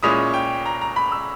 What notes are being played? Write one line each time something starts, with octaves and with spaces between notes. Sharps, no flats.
A#2 G#3 C#4 E4 D#6
G5
A#5
A#5
B5
E6